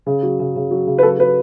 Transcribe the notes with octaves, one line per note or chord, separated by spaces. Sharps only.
C#3
F#3
C#3
C#3
F#3
C#3
B4
F#3 A4
F#3 B4